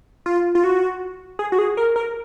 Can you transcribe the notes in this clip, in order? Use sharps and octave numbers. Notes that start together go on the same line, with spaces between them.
F4
F4
F#4
G#4
F#4
G#4
A#4
A#4